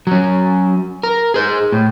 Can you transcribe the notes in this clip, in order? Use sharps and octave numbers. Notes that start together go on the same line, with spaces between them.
F#3 C#4
A#4
G#4 C5
A2